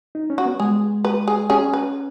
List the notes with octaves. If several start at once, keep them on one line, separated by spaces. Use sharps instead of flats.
D#4
C#4
F#4
B3
G#3 G#4
B4
G#4
C#4 G#4
B4